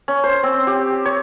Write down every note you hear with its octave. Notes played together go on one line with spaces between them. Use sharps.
C#4
C5
C4
G4
C#5